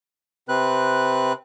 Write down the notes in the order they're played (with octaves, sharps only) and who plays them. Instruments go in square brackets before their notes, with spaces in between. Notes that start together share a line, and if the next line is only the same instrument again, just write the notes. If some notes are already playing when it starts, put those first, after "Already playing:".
[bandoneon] C3 C4 B4 F#6